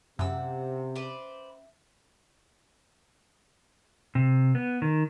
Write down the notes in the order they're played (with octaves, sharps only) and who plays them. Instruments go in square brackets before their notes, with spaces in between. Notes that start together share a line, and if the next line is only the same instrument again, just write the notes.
[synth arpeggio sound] F#2 [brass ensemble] C3 [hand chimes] C#4 E5 [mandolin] F#5 E6
[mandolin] B4 C5 D5
[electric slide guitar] C3
B3
D#3